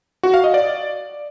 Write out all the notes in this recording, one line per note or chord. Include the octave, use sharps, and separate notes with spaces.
F#4
F5
D#5
D5